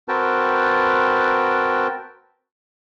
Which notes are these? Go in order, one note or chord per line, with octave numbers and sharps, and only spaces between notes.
C4 F#4 A#4 B4 G5 A5